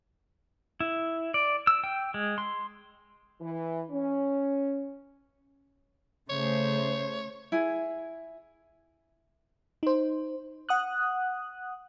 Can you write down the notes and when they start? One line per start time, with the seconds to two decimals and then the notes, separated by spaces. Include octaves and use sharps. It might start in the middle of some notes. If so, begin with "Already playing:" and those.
0.80 E4
1.34 D5
1.67 E6
1.84 G5
2.14 G#3
2.38 C6
3.40 E3
3.90 C#4
6.30 C#3 A3 C5 C#5
7.52 E4 G#4
9.83 D#4 C5
10.69 F#5 D#6 F#6